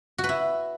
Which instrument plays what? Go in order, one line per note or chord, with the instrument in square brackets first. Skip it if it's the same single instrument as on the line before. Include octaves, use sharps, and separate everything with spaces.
[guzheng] F#4
B4
E4